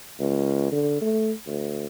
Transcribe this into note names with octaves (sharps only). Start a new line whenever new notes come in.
C#2
D3
A3
D2